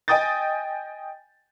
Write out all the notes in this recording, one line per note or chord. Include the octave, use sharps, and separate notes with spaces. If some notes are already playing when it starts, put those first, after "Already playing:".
D#5 G5 G#5 D#6 G6 A6